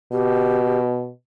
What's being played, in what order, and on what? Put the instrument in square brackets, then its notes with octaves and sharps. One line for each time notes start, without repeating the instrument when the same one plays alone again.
[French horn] B2 [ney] G4